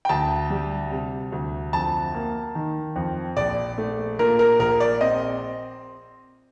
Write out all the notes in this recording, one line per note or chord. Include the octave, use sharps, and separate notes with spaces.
G5
D2 A5
G3
C3
D2
F2 A5
A#3
D#3
F2
A#1 D5
A3
A#2 A#4
A#4
A#1 A#4
D5
C4 D#5